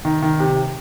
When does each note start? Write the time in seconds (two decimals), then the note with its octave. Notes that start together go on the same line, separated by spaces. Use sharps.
0.05 D#3
0.22 D#3
0.39 C3